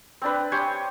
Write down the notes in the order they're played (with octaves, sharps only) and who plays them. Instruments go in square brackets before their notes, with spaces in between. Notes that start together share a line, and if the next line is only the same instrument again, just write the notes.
[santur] C4 D4 B4
G4 C5 C#5 G#5